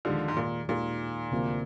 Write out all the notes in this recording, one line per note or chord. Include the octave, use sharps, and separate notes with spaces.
D#2 D3 D#3 F3 G#3 D#4 G4
G#2
A#2
D#2 A#2 D#3 G#3 D#4 G4
D2 C3 F3 A#3